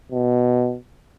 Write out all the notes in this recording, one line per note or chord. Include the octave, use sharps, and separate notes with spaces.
B2